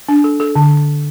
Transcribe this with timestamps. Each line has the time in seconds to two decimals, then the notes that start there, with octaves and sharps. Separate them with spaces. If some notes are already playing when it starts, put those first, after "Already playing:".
0.09 D4
0.24 A4
0.40 A4
0.56 D3